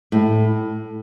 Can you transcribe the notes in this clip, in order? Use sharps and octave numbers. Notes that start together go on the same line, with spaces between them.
A2